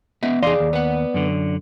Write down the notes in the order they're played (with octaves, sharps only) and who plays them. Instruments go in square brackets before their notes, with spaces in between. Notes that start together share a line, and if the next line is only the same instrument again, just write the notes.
[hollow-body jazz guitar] B3 D#5 E5
[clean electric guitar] E2 D#4 C6 [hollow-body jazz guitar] G#4 F5 [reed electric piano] D5
[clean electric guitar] D#2
[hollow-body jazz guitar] B3 F#5
[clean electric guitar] F#2 D3